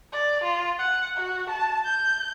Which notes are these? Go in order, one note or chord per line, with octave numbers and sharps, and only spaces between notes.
D5
F4
F#5
F#4
A5
G6